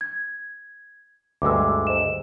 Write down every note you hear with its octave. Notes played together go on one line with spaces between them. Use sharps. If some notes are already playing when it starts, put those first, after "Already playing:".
G#6
D2 G2 G#3 D6 E6
C5 D#5 E7